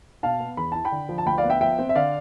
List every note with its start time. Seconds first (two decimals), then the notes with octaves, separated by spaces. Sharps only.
0.23 B2 F5 A5
0.40 B3
0.57 E2 B5
0.72 E4 A5
0.85 G5 B5
0.92 D3
1.09 F3
1.18 A5
1.26 D2 G5 B5
1.38 D5 F5
1.43 B3
1.50 E5 G5
1.61 F3 E5 G5
1.79 C4
1.89 E5
1.95 D3 D5 F5